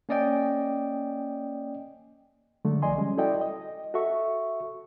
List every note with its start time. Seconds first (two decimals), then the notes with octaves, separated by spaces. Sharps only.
0.09 A#3 C#4 D5 D#5 G5 G#5
2.65 D3 F#3 G#3 A3
2.82 C2 F3 D5 D#5 G#5 C6
2.98 G3 G#3 C#4
3.18 E4 F#4 A4 D5 D#5 G5
3.41 D#5
3.94 F#4 A4 E5 C#6